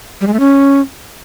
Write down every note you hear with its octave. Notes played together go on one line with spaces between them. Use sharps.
G3
G#3
A3
C#4